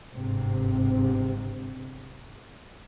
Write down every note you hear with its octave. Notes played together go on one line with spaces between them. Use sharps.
G1 G#2 C3